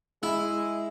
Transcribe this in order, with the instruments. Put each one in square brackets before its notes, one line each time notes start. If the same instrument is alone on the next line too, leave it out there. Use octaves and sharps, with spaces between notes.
[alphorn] G#3 [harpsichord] E4